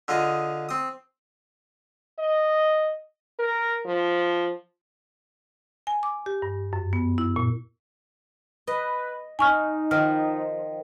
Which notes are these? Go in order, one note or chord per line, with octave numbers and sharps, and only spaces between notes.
D3 F4 G#4 D#5
C4 D#6
D#5
A#4
F3
G#5
D6
G4
G2
F#2
B3
E4
A#2
B4 D#5
D#4 G#5 C#6 F6
D#3 F3 F6